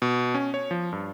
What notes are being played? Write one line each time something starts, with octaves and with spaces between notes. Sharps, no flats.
B2
C#4
C#5
F3
G2